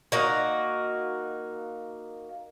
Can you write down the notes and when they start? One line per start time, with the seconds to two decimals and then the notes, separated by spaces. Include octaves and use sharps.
0.12 A#3 D#4 F#4